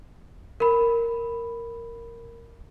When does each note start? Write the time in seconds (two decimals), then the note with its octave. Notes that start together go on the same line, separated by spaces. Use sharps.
0.60 A#4 B5